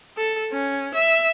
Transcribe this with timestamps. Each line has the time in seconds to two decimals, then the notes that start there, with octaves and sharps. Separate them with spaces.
0.18 A4
0.52 C#4
0.94 E5